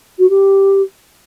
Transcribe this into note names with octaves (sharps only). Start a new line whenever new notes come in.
F#4
G4